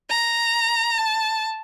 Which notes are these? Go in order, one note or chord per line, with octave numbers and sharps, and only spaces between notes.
A#5
A5